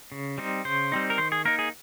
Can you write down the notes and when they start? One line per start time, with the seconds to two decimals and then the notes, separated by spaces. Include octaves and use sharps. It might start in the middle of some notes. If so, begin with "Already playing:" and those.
0.12 C#3
0.38 G3 C4 D#4
0.65 C#3 C5
0.92 G3 C4 D#4
1.10 A#4
1.18 D#3 C5
1.32 G#4
1.45 A#3 D#4 A#4
1.59 G#4